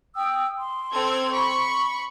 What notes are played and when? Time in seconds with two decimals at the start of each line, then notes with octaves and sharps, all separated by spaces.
0.16 G5 D#6 E6
0.58 C6
0.91 C4 A4 G#6
1.32 B5 C#6